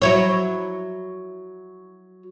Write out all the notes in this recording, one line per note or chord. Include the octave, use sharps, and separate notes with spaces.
F#3 E4 C#5